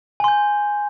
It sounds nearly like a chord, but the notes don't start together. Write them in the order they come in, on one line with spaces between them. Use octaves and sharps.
G#5 C6 G6